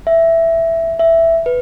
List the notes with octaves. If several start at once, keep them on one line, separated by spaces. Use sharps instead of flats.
E5
E5
B4